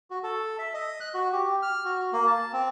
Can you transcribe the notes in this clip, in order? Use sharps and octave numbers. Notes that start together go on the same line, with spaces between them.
F#4
A4
E5
D#5
F#6
F#4
G4
F6
F#4
A#3
A5
C4